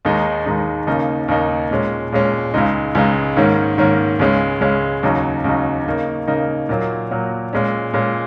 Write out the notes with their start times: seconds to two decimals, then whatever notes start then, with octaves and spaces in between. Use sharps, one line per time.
0.05 D#2 D#3 G#3 D#4
0.46 D#2 D#3 G#3 D#4
0.87 D#2 C#3 A#3 D#4
1.28 D#2 C#3 A#3 D#4
1.71 A#2 G#3 C#4
2.12 A#2 G#3 C#4
2.54 C#2 C#3 G#3 D#4
2.95 C#2 C#3 G#3 D#4
3.37 G#2 D#3 A#3 C#4
3.78 G#2 D#3 A#3 C#4
4.19 C#2 C#3 G#3 C#4
4.61 C#2 C#3 G#3 C#4
5.03 D#2 C#3 F#3 D#4
5.44 D#2 C#3 F#3 D#4
5.86 C#3 A#3 D#4
6.28 C#3 A#3 D#4
6.69 A#2 F#3 A#3
7.11 A#2 F#3 A#3
7.53 A#2 G#3 C#4
7.94 A#2 G#3 C#4